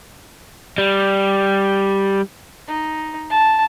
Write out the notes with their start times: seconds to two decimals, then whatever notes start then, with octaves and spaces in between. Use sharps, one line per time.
0.78 G3
2.67 D#4
3.30 A5